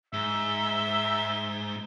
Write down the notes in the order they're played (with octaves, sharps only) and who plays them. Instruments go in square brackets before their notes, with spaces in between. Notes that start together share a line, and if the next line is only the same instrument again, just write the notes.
[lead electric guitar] G#2 [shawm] E5 [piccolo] G7